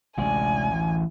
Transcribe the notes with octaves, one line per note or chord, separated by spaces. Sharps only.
A1 D2 C3 G#3 D5 G#5
E3